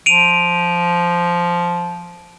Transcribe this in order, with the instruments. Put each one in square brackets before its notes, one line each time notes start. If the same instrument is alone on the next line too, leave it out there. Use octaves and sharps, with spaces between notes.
[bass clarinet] F3 [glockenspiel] D7 D#7 F7